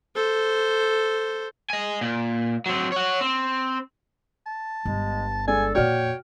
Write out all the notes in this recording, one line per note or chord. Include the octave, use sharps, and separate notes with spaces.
A4 C5
D#5 G#5
A#2
F#3 C4
C#5 F#5
C4
A5
G1 G#3
G#3 D4 A4 G#5
F2 A#2 F#4 C#5 D5 G5 F6